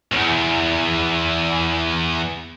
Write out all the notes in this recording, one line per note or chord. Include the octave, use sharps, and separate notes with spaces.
B1 E2